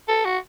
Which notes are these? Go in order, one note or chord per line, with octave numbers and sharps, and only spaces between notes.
A4
F#4